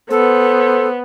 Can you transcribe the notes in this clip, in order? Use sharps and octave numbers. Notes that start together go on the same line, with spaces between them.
B3 A4 C5